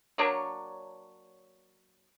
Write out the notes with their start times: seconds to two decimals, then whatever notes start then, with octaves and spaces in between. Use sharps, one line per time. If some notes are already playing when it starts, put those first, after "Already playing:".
0.18 F#3 A#3 D4 C#5